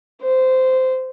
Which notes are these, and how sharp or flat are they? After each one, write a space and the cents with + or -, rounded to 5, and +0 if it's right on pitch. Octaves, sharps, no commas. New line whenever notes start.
C5 -15